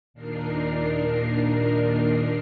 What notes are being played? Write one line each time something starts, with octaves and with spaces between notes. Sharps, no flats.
D#2 A#2 D4 D#4 A#4 C7